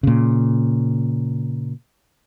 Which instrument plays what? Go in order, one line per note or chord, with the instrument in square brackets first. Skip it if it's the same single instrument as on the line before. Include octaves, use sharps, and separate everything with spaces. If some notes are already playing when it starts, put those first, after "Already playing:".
[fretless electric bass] A#2 C#3